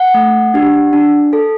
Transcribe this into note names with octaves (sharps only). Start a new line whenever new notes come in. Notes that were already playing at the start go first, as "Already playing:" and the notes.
Already playing: F#5
A3
D4 G4
D4
A4